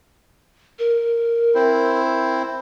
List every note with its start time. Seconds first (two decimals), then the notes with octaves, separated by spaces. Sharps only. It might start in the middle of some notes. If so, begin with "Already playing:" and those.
0.79 A#4
1.55 C4 E4 C5